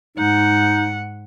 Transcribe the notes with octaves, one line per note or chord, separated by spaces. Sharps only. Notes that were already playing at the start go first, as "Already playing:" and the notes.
G#2 D#4 F#5